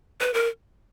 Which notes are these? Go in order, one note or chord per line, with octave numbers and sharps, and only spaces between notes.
B4
A#4